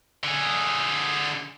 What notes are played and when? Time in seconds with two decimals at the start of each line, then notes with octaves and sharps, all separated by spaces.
0.24 D3 G#4